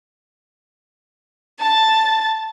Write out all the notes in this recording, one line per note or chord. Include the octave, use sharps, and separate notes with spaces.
A5 A6